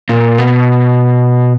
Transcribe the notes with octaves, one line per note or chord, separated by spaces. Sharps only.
A#2
B2